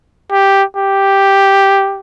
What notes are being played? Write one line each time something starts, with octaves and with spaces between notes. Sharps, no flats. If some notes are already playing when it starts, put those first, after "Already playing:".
G4
G4